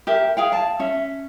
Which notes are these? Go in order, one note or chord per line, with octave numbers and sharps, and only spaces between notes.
G4 A#4 E5
G#4 F5 G5
F5 A5
C#4 E5